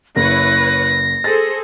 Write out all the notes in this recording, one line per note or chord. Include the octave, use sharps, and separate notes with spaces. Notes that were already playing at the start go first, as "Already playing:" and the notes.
F#1 E4 B4 C#5 A#6
G#4 A4 C5 A6